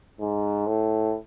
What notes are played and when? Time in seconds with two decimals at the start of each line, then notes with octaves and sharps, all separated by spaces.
0.20 G#2
0.67 A2